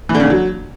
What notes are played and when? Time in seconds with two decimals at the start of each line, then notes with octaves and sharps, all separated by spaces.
0.09 E3
0.15 D3
0.20 C#3
0.25 D3
0.30 F#3